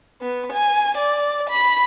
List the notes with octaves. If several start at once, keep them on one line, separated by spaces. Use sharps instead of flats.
B3
G#5
D5
B5